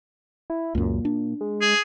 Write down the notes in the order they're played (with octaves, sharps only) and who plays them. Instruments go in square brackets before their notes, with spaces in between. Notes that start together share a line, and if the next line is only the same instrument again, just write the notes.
[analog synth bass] E4
[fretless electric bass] C#2 F#2 [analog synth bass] A#2
[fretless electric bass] D4
[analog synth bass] G#3
[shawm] G#4